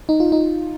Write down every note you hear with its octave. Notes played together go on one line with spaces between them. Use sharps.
D#4
F4
D#4